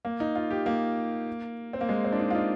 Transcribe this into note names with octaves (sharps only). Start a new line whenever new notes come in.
A#3
D#4
F4
G4
A#3
C4
A#3
G#3
C4
D4
D#4
F4
D#4